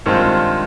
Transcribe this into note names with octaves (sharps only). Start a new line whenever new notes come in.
G2 D#3 G#3 C4 F4